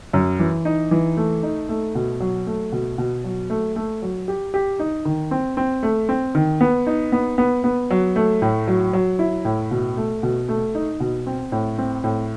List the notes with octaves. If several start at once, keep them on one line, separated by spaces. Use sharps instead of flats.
F#2
E3
D#4
E3
A3
D#4
A3
B2
F#3
A3
B2
B2
F#3
A3
A3
F#3
G4
G4
D#4
D#3
C4
C4
A3
C4
D#3
B3
D#4
B3
B3
B3
F#3
A3
A2
F#3
F#3
E4
A2
B2
A3
B2
A3
D#4
B2
C4
A2
C4
A2